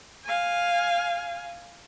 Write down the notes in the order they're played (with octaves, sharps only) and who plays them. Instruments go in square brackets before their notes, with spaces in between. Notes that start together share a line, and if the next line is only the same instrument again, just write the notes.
[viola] F5 G#5